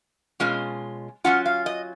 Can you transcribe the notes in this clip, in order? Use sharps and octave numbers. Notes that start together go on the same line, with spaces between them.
B2 G#3 C#4 F4
F#3 C#4 F4 F#5
F5
D#5